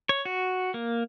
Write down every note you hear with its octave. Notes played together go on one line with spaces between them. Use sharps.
C#5
F#4
A#3